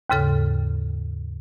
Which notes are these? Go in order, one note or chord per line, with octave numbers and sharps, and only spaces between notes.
D#2 G#2 C#3 A4 F6